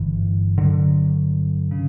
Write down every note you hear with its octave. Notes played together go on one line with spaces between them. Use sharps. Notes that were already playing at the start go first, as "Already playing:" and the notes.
Already playing: G1 G2 D3 E3
D3 F#3
C#3